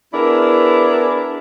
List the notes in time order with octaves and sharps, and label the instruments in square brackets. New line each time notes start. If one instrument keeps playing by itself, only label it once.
[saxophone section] B3 D4 E4 G#4 A#4